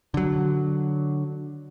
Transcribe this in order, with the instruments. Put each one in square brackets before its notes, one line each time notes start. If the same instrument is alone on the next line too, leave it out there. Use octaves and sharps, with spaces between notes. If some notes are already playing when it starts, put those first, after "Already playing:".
[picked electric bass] D3 F#3